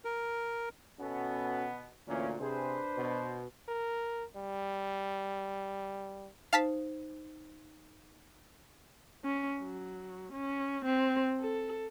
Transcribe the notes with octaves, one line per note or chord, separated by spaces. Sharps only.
A#4
B2 B3 C#4 F#4 A4
D2 A#2 E3 A#3 C#4
C3 D4 G#4 B4 C5
B2
A#4
G3
D#4 C5 F5 A5 B6
C#4
F#3
C#4
C4
A4